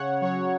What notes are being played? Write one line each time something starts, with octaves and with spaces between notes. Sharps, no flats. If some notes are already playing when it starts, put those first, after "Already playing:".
Already playing: C#3 C#5 F#5
F#3 C#5 F#5